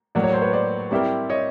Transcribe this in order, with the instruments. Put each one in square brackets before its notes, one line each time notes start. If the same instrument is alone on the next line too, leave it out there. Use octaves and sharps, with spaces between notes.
[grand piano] A2 F#3 A#3 [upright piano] D5
[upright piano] C#5
C5
B4 C#5
C5 D5
[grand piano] G3 C4 E4 G4 A#4
[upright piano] C#5 D#5